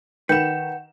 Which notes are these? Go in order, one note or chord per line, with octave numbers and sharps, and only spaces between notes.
D#3 B4 F#5 G5 G6 C#7 E7